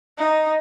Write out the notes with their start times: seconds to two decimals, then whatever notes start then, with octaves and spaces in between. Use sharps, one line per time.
0.18 D#4